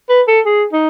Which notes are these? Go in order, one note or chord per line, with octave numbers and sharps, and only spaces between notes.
B4
A4
G#4
D#4